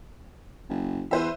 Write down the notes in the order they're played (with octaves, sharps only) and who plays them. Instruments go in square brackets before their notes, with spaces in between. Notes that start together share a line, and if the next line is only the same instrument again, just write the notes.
[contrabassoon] F#1
[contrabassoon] E2 [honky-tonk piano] B4 C5 E5